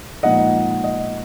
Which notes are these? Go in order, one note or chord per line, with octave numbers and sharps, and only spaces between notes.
A#2 F3 G#3 D#4 D#5 F#5
D#5